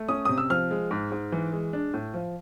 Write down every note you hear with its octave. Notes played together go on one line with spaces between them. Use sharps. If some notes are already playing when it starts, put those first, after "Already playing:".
Already playing: A3
C#4 D#6
C3 D#6
E6
F3 F6
G#3
G#2
G#2
E3
G#3
D4
A2
F3